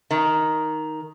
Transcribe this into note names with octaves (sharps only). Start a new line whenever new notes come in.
D#3